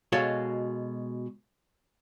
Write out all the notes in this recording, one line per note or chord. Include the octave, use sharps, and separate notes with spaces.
B2 G#3 F#4 A4 C#5 F5